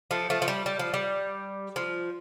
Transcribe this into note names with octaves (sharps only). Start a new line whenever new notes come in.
F3 A3
F3 A3
F3
G3
G3
F3
G3
F3